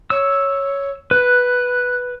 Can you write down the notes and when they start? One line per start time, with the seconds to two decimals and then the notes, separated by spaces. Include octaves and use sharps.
0.10 C#5 E6
1.11 B4 F#6